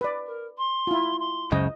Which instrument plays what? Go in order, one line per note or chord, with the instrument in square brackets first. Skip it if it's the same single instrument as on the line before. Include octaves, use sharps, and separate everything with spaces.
[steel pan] B4 D5
[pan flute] A#4
C6
[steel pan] E4 F4
[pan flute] C6
[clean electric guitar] C#2 F#2 C#3 [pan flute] C5 [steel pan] D#5